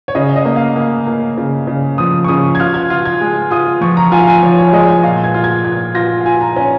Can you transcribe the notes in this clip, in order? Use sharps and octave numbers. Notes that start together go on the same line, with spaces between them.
C#5
C#3 D#5
D#5
A#3
F5
A#3
A#3
C#3
C#3
F3 D#6
C#6
C#3 D#6
G#6
F4 F6
G#6
F4
G#6
G#3
F4 D#6
F3 C#6
A#5
F4 G#5
F5
G#5
F3 C#5
C#5
G#3 D#5
G#5
A#2 F5
G#6
F4
G#6
A#2 G#6
F4 A#6
F5
F4 G#5
A#5
C#4 G#5